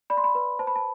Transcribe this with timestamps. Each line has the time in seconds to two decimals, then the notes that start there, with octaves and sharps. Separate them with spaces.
0.10 D5 B5
0.17 C6
0.24 B5
0.35 B4
0.59 C5 A5
0.67 B5
0.76 A5